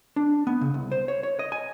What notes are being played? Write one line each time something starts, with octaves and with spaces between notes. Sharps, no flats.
D4
B3
C#3
C2
C5
C#5
C#5
D#5
G#5